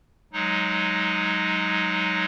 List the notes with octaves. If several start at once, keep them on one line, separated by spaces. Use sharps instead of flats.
F#3 G#3 D#4